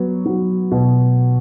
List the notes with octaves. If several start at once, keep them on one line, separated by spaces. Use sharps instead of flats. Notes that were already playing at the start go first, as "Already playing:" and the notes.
Already playing: F#3 B3
F#3
B2